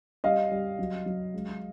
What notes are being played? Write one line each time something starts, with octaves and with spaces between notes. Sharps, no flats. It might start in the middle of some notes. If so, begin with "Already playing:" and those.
G3 D#5 F5
G3
F#3
F#3
G#3